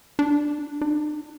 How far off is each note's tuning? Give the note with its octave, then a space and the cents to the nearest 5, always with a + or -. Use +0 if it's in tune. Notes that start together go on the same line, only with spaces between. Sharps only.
D4 +5
D4 +45